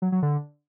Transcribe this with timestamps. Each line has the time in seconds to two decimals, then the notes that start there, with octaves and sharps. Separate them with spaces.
0.02 F#3
0.12 F#3
0.22 D3